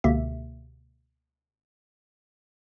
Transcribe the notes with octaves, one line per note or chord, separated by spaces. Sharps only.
C#2 B2 D3 A#3 G4 E5